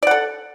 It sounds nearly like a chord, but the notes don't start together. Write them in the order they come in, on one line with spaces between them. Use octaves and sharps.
D5 F#5 A4